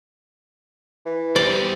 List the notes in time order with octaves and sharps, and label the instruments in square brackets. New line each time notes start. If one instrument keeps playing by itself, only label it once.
[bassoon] E3
[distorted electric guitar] E2 [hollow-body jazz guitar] G3 C5 [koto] D5